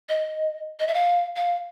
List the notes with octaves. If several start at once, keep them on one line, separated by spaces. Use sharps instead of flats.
D#5
D#5
E5
F5
F5